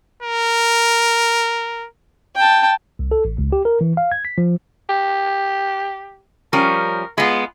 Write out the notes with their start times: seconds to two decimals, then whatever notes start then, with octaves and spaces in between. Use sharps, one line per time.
0.23 A#4
2.36 G5 A5
2.99 C2
3.11 A4
3.25 A1
3.38 C#2
3.52 G4
3.65 A#4
3.81 E3
3.97 F5
4.12 G#6
4.25 B6
4.38 F3
4.89 G4
6.53 F3 G3 C#4 A#4
7.18 G#3 B3 F4